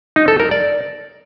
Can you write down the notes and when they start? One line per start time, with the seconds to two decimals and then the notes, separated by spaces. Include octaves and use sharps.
0.16 D#4
0.28 A4
0.40 A#4
0.51 D5